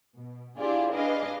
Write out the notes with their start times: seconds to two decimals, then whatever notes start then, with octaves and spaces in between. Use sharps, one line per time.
0.17 B2
0.59 D4 E4 F4 G4 G#4 D5
0.92 D4 G#4 B4 D#5 F5